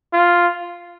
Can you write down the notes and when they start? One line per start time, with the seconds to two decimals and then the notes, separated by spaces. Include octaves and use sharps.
0.14 F4